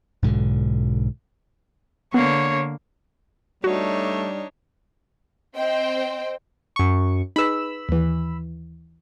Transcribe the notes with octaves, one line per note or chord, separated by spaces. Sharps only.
B1 G#2 B2 D3
D3 A#3 B3 C#5
G3 A3 D4 D#4 F#4 C#5
C4 C5 D#5 G5
F#2 C#6
D#4 G#4 B4 B5 E6
D#2 E3